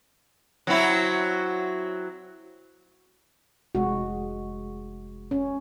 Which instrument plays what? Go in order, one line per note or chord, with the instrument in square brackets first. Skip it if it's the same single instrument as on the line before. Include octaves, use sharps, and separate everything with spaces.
[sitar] F#3 C4 E4
[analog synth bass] F1 [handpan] G#3 F#4
[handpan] C#4